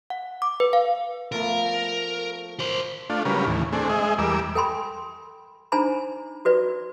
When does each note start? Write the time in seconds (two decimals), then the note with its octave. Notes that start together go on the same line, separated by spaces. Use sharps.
0.10 F#5
0.42 D6
0.60 B4
0.73 F5
1.32 F3 A3 B3 A#4
2.60 A#4 C5
3.10 A3 D4 F4
3.25 C#3 F#3 G3 C#4 A#4 B4
3.46 D#2 A2 E3
3.73 A3 C4 D4 G#4
3.89 G#3 G#4 D#5 E5
4.18 E2 G3 A#4 D6 E6
4.55 A4 G5 G#5 B5 C6
5.72 D4 D#4 C5 G#5 A#5 B5
6.45 F#4 B4 D5